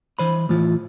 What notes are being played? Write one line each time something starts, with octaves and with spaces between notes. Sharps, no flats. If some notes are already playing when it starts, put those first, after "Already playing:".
E3 C5 B5
A2 E3 F4